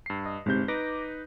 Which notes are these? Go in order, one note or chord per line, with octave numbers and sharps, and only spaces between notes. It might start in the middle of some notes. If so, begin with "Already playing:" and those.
G2 C7
D#5
G1 G#2 C3 G6
D#4 B4 D6 A#6